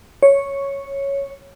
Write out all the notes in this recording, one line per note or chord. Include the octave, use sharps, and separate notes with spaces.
C#5